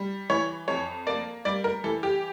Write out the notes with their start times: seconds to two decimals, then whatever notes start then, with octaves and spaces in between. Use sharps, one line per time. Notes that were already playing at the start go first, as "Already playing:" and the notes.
Already playing: G3
0.30 E3 C#5
0.68 F2 C#5
1.07 A#3 D5
1.45 G3 D5
1.64 A#4
1.84 E3 A4
2.03 G4